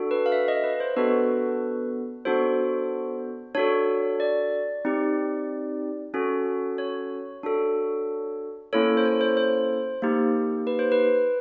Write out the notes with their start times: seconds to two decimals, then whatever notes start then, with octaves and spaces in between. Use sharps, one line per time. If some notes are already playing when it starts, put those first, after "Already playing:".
Already playing: D4 F#4 A4
0.11 B4
0.26 F5
0.32 E5
0.48 D#5
0.64 B4
0.80 C5
0.97 B3 D4 F#4 A4 B4
2.25 B3 D4 F#4 A4 C5
3.55 D4 F#4 A4 C#5
4.20 D5
4.85 C4 D#4 G4
6.14 C#4 F#4 A4
6.78 C#5
7.43 D4 F#4 A4
8.73 A#3 C#4 E4 A4 C#5
8.97 C5
9.05 C#5
9.21 C5
9.37 C5
10.02 A#3 D#4 G4
10.67 B4
10.79 C5
10.92 B4